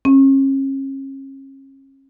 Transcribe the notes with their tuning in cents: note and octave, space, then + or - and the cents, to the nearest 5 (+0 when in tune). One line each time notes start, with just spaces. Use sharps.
C#4 -40